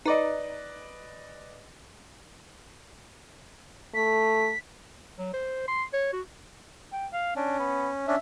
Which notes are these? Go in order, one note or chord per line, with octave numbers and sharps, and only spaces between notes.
D#4 B4 D5 D#5
A3 B6
F#3
C5
C6
C#5
F#4
G5
F5
C#4 D4
B3
C#4 D4 E5